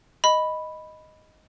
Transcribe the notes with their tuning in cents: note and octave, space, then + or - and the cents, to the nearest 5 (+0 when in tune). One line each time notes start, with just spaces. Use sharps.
D#5 +0 B5 +0